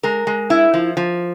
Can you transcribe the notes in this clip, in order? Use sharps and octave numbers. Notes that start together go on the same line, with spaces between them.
G#3 A#4
G#3
E4
F3
F3